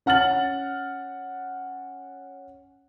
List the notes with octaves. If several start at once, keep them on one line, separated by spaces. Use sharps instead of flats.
C#4 F#5 F6 A6 F#7